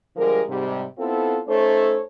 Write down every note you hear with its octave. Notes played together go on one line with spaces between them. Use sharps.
D3 F3 G3 G#3 A#4
G#2 C3 G3
B3 C4 E4 F4 A4
A3 C#4 D#4 A4 C5 C#5